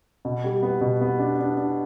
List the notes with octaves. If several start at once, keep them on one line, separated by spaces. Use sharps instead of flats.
B2
G3
B3
B2
B3
D4
D4
D4